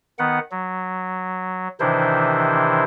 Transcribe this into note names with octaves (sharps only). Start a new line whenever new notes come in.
D#3 B3 F#5
F#3
C3 D#3 E3 D4 E4 C5